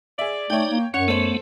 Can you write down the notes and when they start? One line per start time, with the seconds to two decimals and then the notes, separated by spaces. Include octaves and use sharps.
0.19 G#4 D5 E5
0.50 A3 D#4 C#5 G5
0.70 A#3
0.94 F#2 C#4 C#5 F#5
1.08 A3 B3 A4 C5